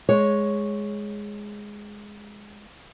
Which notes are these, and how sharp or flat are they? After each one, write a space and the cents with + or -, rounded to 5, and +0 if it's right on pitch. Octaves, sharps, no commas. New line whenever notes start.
G#3 +0 C#5 +0